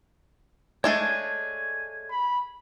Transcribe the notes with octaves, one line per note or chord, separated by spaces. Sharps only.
G#3 A3 D4 C#5 G#5
B5